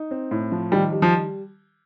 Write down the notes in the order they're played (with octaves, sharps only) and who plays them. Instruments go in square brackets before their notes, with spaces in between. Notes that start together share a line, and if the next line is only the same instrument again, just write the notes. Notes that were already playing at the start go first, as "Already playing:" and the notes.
Already playing: [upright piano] D#4
C4
A2
F3
[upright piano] D#3 [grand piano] G3
[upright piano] G3
[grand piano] F3